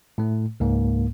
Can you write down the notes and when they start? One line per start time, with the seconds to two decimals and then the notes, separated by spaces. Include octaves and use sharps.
0.18 A2 A3
0.60 C#2 G#2 A#3